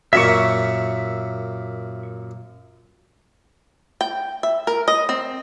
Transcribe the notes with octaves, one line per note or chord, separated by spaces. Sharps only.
F#2 A#2 A#3 E5 C#6
G5
E5
A#4
D#5
C4